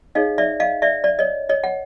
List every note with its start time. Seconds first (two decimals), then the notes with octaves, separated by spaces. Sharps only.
0.15 D#4 G#4 C#5 D#5 F5
0.38 D5 E5
0.60 D#5 F5
0.82 D5 E5
1.04 D5
1.19 C#5 D#5
1.49 C#5 D#5
1.64 F#5